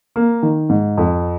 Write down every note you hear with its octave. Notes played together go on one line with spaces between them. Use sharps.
A#3
D#3
G#2
F2